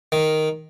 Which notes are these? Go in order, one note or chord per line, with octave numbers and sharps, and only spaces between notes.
D#3